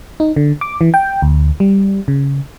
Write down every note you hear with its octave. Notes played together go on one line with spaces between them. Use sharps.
D#4
D3
D6
E3
G5
D2
G3
C#3